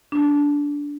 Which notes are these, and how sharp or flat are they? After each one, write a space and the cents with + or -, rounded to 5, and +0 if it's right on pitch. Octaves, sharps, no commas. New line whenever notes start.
D4 -15